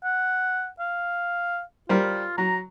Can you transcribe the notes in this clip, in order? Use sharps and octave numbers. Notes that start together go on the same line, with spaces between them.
F#5
F5
G3 F4 A#4 C5
F#3 A#5